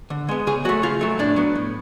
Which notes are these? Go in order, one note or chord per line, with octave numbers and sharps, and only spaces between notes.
D3
G#3 B3
C#3 G#4
F#3 A3 F#4
C#3 F4
F#3 A3
A2 D4
F#3 B3
A2